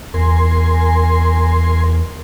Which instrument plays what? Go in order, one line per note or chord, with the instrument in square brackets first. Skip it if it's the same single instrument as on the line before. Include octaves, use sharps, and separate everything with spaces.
[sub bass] E2 [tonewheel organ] A#4 G#5 C6